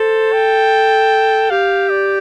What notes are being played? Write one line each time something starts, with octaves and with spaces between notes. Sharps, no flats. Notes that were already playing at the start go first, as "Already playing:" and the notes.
Already playing: A4 C5
G5
G4 F5
D5